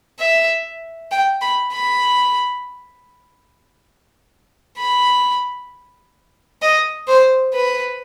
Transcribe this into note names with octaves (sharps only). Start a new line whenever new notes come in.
E5
G5
B5
B5
B5
D#5
C5
B4